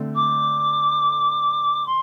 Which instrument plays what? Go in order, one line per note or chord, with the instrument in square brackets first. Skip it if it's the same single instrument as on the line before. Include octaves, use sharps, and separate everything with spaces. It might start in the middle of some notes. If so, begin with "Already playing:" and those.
Already playing: [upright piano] D3 A3 C4
[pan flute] D6
C6